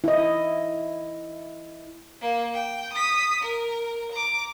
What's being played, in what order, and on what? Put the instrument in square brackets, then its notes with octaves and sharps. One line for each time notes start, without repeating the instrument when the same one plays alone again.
[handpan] E4 D#5
[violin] A#3
G5
D#6 B6
A#4
A#5 D6